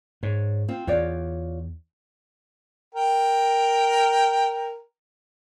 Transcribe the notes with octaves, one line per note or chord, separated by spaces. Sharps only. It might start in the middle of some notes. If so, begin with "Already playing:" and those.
G#2 C#5
C4 F4
E2 F4 C#5 D5
A#4 G5